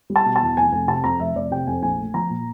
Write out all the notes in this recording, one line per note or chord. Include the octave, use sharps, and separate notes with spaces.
G3
A5
B2
A5
E2
F1 G#5
F1 G#5
C3 A5
F2 A#5
F1 E5
F1 D5
C3 G5
F2 G#5
A#1 G#5
A3
F3 A#5
A#2